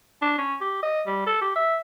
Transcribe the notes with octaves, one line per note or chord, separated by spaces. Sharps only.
D4
C#4
G4
D#5
G3
A4
G4
E5